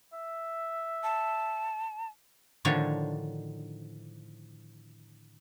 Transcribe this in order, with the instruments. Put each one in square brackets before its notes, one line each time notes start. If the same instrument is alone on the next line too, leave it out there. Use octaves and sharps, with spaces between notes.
[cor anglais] E5
[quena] A5
[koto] A2 D3 D#3 F3 D4 C#5